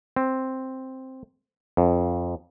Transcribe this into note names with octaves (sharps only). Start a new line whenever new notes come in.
C4
F2